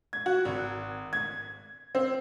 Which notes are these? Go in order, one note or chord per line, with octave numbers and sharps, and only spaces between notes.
G#6
F#4
G#1
G#6
C4